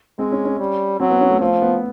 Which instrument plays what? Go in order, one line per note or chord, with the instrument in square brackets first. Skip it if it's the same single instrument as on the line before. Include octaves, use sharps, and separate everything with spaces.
[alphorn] G#3 [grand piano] C4
[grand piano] C#4
C#4
[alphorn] G3
[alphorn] F#3 [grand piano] C4
[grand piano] B3
C#4
A3
[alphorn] F3 [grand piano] A3
[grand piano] B3